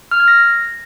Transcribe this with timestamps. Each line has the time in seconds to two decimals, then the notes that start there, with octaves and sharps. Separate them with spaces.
0.11 F6
0.20 G#6
0.28 A#6